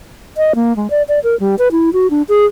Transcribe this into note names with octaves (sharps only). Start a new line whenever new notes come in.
D#5
A#3
G#3
D5
D5
A#4
G3
B4
E4
F#4
D4
G#4